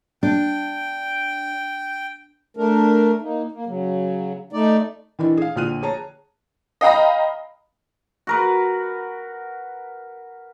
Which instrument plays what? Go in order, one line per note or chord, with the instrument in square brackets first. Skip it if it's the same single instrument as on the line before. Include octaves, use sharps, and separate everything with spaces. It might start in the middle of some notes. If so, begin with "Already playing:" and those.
[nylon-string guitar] D4 [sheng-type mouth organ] G5
[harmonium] A3 D4 A#4
A#3 D#4
A#3
C#3 F#3
A3 D#4 D5
[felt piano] D#3 E3 D4 E4
G#4 F5
A#1 D3 F4 F6 F#6 D#7
G#4 C#5 A5 A#5
[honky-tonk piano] D#5 F5 G5 A#5 B5
[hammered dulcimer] F#4 A#4 B4